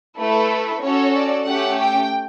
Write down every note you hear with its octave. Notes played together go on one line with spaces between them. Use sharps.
A3 E4 A4 B4
C#4 F#4 A4 C#5
D5
A3 C#4 G4 F#5
G5